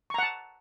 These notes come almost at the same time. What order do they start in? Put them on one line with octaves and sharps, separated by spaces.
C#6 A#5 F#5 A5